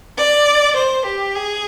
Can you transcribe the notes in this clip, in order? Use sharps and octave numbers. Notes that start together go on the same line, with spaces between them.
D5
C5
G4
G#4